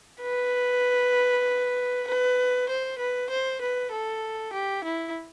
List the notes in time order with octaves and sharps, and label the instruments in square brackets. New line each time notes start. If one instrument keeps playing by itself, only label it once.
[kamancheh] B4
B4
C5
B4
C5
B4
A4
G4
E4